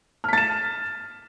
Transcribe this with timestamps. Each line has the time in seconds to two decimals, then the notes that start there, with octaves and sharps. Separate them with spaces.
0.24 F6
0.28 B6
0.33 A6
0.38 E7